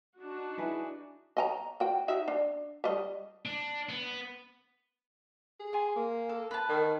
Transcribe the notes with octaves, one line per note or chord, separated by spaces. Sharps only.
D4 D#4 F#4
E4 G#4 B4
D#5 G#5 A#5
F#4 G5
D#4 F#4 E5
D4
G3 D#5
D4
B3
G#4
G#5 C6
A#3
A4
B4 A5
D#3